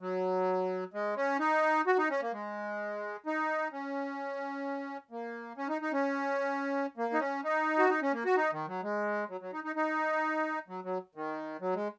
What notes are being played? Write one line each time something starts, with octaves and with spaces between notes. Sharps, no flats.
F#3
G#3
C#4
D#4
F#4
D#4
C#4
A#3
G#3
D#4
C#4
A#3
C#4
D#4
D#4
C#4
A#3
D#4
C#4
D#4
F#4
D#4
C#4
A#3
F#4
D#4
D#3
F#3
G#3
F#3
F#3
D#4
D#4
D#4
F#3
F#3
D#3
F#3
G#3